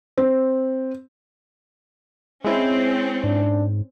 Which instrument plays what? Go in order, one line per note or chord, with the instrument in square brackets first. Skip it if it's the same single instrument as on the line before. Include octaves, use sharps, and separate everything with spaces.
[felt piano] C4
[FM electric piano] G#3 E4 [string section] C4 C#4
[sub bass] G#2 [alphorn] D4